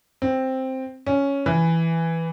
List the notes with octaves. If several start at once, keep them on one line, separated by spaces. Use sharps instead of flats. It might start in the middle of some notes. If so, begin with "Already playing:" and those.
C4
C#4
E3